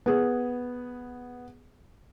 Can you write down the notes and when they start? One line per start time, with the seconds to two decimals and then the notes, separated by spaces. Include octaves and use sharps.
0.06 B3 G#4